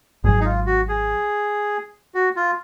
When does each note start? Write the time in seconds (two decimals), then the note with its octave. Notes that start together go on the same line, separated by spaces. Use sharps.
0.24 G#1 G#2 F#3 G#4
0.41 D#4
0.45 F4
0.66 F#4
0.88 G#4
2.14 F#4
2.36 F4